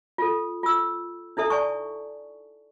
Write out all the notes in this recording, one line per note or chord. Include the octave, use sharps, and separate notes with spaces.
F4 A4
F4 E6
D#4 E4 A4 E5
D5 G#5 A5 C#6